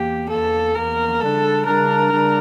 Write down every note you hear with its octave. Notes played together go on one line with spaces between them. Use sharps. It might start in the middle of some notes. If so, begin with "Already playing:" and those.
Already playing: E2 E3 A#3 G4
E2 E3 A#3 A4
E2 E3 A#3 A#4
C#3 G3 D4 A4
C#3 G3 D4 A#4
C#3 G3 D4